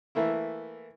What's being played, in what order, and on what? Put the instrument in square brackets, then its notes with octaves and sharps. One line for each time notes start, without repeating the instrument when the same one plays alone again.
[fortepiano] E3 A3 A#3 E4